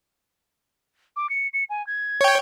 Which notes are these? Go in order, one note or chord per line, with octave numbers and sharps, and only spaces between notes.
D6
C#7
C#7
G#5
G#6
C#5 G5